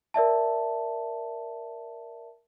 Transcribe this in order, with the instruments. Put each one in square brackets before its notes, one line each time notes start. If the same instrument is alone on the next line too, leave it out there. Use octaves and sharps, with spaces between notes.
[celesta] A#4 D5 E5 A5